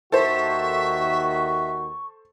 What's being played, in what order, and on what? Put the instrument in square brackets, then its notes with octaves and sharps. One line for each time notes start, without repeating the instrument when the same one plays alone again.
[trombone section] D#2 D#3 F#4 [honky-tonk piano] A4 C5 [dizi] E5 [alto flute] C#6